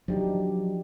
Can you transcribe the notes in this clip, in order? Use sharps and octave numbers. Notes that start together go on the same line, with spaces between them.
F3 F#3 D4 D#4 G4